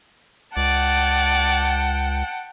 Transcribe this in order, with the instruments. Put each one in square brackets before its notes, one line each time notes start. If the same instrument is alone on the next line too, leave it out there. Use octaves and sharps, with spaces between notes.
[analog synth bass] C#2 [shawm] D5 [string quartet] F#5 G5 A5